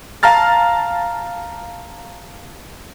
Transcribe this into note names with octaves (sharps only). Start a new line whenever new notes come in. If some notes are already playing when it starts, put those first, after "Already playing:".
F5 A5 A#5 F6 A6